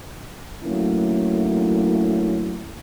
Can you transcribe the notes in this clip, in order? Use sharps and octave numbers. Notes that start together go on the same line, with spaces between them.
D3 F#3 A3 A#3 C#4 E4